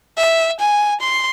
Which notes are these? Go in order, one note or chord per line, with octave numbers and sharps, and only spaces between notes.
E5
G#5
C6